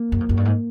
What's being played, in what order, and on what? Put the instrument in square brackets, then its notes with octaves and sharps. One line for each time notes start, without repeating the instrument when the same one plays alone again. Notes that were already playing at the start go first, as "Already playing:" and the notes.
Already playing: [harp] A#3
[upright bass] F#2
F2
F#2
G2
G#2